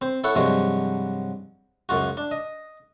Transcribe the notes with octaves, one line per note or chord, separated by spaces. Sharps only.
C4 C5
E4 A4 C#5 F#5
G2 C3 F3 F#3 G#3 F#4
C#2 F#2 F4 F#4
D4
D#5